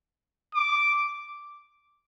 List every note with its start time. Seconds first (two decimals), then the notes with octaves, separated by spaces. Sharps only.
0.55 D6